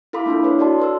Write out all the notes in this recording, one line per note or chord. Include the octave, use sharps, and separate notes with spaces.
E4 A4 F5 B5 C6 D6
A#3 D4 E4 F4
A4 B4 C#5
F#4 A4 D5 A5 C6
A4 B4 C6 E6